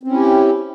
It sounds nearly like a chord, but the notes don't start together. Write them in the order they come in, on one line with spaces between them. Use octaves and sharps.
C4 C#4 E4 G4